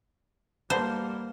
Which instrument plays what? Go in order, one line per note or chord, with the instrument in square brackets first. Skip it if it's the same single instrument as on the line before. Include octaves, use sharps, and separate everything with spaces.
[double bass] G3 A#3 [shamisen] B3 D4 D#4 [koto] C5